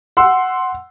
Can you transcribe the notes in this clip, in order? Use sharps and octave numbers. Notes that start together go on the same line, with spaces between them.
F#5 C6 E6